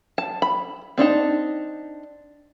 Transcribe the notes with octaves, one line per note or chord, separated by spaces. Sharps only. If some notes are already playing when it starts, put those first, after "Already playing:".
A5
B5
C4 D4 D#4 A5